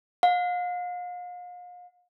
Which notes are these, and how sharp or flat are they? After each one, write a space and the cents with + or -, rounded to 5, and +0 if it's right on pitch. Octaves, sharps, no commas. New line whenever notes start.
F5 +40